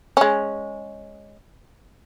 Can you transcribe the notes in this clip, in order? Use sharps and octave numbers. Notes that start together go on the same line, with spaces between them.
G#3 C#4